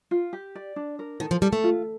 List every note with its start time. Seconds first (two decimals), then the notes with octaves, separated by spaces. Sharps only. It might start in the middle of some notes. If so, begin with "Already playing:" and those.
0.11 F4
0.33 G4
0.55 D5
0.76 D4
0.99 A#4
1.20 D#3 A4
1.31 F3
1.42 G3 A4
1.53 A3
1.64 F4